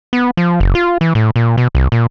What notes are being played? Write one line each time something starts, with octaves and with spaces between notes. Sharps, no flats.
B3
F3
F#1
F4
E3
A2
A#2
B2
C2
A#2